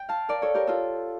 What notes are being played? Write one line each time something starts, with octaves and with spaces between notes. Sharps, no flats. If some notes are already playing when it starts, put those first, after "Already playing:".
Already playing: G5
F5 A5
A#4 D5
A4 C#5
G4 A#4
F4 A4